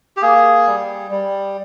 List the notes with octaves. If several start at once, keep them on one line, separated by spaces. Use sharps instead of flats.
G4
A#3 G#4
G3
G3